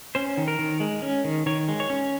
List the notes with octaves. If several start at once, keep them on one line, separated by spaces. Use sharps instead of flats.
C#4 C5
D#3
A#4
D#3
G#3
C#4
D#3
D#3 C#5
G#3
C#5
C#4